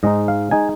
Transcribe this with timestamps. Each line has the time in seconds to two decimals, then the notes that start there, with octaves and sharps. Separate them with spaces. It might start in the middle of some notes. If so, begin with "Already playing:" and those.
0.03 G#2 G#3 D#4 D#5
0.28 F5
0.51 G#3 D#4 G#5